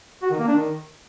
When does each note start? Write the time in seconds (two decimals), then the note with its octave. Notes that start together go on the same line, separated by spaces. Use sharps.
0.22 F#4
0.31 D#3
0.39 A#3
0.47 D4
0.55 D#3